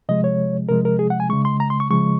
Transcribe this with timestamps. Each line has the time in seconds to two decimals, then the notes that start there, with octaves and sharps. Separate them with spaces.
0.09 C3 F3 G#3 D#5
0.24 C#5
0.69 C3 F3 G#3 A#4
0.85 A#4
0.99 G#4
1.10 F#5
1.20 G#5
1.29 C#3 G#3 C#6
1.45 C6
1.60 A#5
1.70 C6
1.80 C#6
1.91 C#3 F3 G#3 C#6